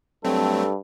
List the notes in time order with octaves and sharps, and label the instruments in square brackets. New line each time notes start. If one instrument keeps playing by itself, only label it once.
[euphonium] G2 [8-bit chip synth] F#3 A3 C4 [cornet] A4